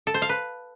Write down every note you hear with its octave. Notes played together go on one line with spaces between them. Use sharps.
A4
C5
F5
B4